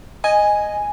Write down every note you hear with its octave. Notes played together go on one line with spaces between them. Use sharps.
D#5 G#5